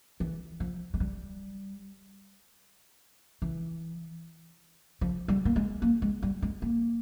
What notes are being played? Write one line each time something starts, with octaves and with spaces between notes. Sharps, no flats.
E3
F3
G#3
G3
E3
F3
G3
A#3
G#3
A#3
G#3
G3
G#3
A#3